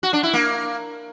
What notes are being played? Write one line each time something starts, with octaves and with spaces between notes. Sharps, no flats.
F#4
D4
E4
A#3